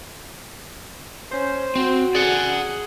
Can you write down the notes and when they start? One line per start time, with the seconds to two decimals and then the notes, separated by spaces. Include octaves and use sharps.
1.31 C#4 C5
1.76 C4 F#4
2.15 G#4 D5 F#5